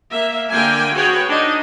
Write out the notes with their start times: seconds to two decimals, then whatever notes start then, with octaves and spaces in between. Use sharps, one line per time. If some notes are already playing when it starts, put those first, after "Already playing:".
0.12 A#3 E5
0.51 D3 A#3 G5 G#5
0.94 F#4 G#4 B4 C#5 G5
1.29 D4 D#4 D#5